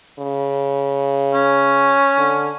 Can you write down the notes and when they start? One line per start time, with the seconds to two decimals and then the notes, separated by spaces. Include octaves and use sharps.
0.19 C#3
1.34 C#4
2.18 D3